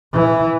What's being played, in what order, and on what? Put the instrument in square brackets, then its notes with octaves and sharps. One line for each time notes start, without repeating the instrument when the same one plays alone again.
[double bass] E3